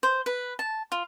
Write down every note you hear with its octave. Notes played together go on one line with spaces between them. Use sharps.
C5
B4
A5
F4